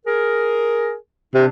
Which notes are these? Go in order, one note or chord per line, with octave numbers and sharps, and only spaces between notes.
G#4 A#4
C3 D4